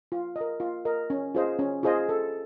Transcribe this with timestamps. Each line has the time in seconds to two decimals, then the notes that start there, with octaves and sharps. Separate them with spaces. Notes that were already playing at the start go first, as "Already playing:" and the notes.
0.12 F4
0.36 D#5
0.41 A#4
0.60 F4
0.85 A#4 D#5
1.10 C#4
1.35 F4 G#4 C5 D#5
1.59 C#4
1.83 F4 G#4 C5 D#5
2.09 A4